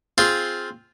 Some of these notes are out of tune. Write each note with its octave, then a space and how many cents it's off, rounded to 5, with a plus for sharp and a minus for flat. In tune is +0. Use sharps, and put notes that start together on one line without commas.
C4 +0 F4 +0 G#4 +0